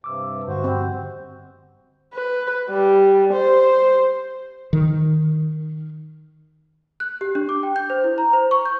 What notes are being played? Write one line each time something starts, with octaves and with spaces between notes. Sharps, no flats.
G2 C3 D6 E6
G2 D3 G3 F#4 C5
C4
B4
G3
C5
D#3
F#6
G4
D4
D6
G5
G6
C5
E4
A#5
C5
C#6
G6